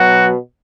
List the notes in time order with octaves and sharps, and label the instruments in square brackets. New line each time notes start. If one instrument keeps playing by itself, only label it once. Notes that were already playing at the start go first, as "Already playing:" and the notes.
Already playing: [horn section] B2 F#3 F#4